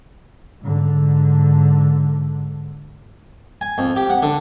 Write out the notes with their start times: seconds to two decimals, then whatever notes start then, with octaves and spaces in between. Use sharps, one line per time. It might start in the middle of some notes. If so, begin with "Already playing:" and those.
0.61 G#2 D3
3.61 G#5
3.78 F2
3.96 G4
4.10 F#5
4.23 D3